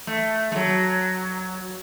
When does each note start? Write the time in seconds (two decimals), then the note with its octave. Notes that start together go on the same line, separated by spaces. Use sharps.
0.07 A3
0.52 A3
0.56 F#3